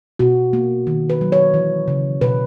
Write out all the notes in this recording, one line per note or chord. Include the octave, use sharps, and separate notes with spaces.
B2 F#4
A#3
D#3
B4
F#3
C#5
E3
C#3
B2 B4